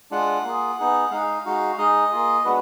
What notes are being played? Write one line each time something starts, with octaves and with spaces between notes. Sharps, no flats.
G#3 D4 F4 F#5
A#3 F4 G#4
B3 D#4 G#4
G#3 D#4 G#4 F5
G#3 D#4 F#4
G#3 D#4 G#4 D#5
A#3 F4 G#4
G#3 B3 D4 F#4 B4